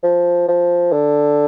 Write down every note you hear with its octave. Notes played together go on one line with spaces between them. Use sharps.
F3
F3
D3